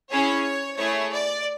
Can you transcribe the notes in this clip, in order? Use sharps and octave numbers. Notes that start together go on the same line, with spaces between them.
C#4 E4 G#4 C#5
A3 E4 G#4 C#5
D5